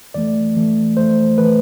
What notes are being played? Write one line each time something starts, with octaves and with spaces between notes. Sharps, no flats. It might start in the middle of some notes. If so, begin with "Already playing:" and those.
F2 E3 A3 D5
F2 E3 A3
F2 E3 A3 C5
E3 A3 B4